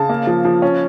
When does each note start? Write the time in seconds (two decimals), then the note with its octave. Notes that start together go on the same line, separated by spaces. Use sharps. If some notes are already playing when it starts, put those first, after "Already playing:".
Already playing: C#3 A5
0.09 A#3
0.27 F3
0.45 F3
0.62 C#4